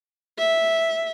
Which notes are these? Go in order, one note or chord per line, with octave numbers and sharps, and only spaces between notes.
E5